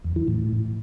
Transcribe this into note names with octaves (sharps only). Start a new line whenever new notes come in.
E2
E3
A2